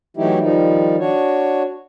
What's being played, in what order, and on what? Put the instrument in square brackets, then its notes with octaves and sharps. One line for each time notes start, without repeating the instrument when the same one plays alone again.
[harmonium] E3 F#3 A3 D#4 E4 G4
D#3 F3 G3 D#4
D4 F#4 C#5